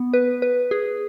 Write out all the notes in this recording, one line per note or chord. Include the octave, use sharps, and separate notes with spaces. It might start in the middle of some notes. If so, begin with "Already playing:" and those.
Already playing: B3
B4
B4
G#4